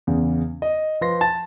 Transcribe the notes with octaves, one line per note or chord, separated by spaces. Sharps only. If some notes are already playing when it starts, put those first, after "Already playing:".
E2 C#3
D#5
F3 B4 C6 A#6
A5 A6